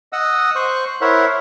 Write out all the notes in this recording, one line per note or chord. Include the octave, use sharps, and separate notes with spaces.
D#5 F#5 D#6 E6
C5 C#6 F#6
E4 A#4 C5 C#5 E5 F#5